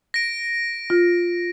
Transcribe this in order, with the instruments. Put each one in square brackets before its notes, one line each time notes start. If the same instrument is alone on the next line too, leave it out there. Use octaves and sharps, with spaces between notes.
[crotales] A#6 D7
[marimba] F4